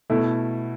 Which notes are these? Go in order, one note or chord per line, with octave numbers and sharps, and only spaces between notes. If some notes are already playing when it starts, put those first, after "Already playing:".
B2 A3 E4